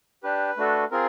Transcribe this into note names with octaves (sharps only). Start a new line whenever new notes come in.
D4 G4 B4
A3 D4 F#4 A4
C4 F4 G#4 A#4